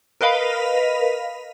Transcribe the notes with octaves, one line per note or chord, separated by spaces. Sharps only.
A#4 B4 D#5 F5 B5